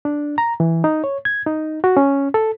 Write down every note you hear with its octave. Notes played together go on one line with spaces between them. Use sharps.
D4
A#5
E3
D#4
C#5
G#6
D#4
F#4
C#4
A4